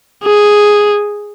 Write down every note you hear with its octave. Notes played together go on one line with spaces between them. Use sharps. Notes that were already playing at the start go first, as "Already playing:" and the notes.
G#4